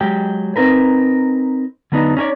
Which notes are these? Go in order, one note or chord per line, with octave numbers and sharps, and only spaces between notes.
F#3 G#3 G4 G5
C4 D#4 A#4 B4
D3 F#3 B3 D4 D#4
C#4 D#4 G#4 C#5 D5